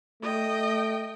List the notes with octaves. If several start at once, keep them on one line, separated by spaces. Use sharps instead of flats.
A3 D#5 G5